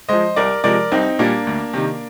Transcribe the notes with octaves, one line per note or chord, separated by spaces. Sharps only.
F3 G#3 C5 D#5
C2 A#4 D5
C3 F3 G#3 A#4 D5
C2 C4 D#4
A#2 G3 A#3 D4
D2
C3 D#3